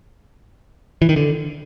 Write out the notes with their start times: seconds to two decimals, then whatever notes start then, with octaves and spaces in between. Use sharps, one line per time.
1.02 E3
1.09 D#3
1.16 D3